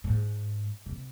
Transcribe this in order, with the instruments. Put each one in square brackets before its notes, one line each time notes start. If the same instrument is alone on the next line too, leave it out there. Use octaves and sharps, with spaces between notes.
[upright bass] A2
G#2
C3